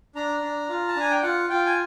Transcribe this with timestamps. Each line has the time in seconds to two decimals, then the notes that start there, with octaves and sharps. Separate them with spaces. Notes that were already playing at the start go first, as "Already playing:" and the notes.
0.15 D4 A#5
0.42 D4
0.69 F4
0.88 A5
0.96 D4 G#5
1.11 G5
1.22 F4 F#5
1.49 F4 G5
1.66 G#5